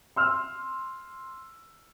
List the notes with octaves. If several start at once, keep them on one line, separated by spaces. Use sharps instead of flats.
C6 E6 F6